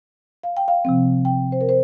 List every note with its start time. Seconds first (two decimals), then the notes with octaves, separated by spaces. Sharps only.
0.44 F5
0.57 G5
0.68 F5
0.85 C3 F3 C4
1.25 G5
1.52 C5
1.61 A#4
1.69 C5